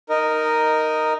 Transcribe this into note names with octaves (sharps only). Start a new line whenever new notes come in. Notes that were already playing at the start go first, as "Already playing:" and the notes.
D#4 A#4 D#5